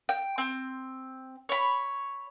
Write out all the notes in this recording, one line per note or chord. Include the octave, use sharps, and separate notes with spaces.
G5
C4
C#5 B5